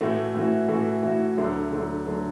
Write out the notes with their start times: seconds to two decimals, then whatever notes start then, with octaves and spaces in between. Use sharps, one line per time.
0.01 A2 E3 A3 F#4
0.35 A2 E3 A3 F#4
0.69 A2 E3 A3 F#4
1.03 A2 E3 A3 F#4
1.37 D2 D3 F#3 A3
1.71 D2 D3 F#3 A3
2.06 D3 F#3 A3